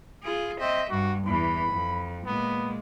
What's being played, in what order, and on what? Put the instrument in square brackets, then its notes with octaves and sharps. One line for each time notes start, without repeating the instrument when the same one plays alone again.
[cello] F4 G#4
[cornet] C4 [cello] D#5 E5
[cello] G2 [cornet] F#4
[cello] E2 E3 [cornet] B5
[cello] F2
[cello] A#2 G#3 [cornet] B3